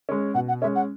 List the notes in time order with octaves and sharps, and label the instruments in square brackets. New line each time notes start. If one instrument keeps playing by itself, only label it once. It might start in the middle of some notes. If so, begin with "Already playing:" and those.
[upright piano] G#3 C#4
[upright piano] B2 [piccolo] F#5
[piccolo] F#5
[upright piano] G#3 C#4 [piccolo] E5
[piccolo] F#5